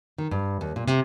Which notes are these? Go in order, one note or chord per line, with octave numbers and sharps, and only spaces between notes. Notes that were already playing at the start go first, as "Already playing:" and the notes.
D#3
G2
D#2
A#2
C3